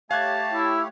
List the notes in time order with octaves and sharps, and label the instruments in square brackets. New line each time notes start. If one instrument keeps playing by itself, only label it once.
[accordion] A3 G4 C#5 [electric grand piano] F5 F#6 G#6 [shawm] A5
[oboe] E4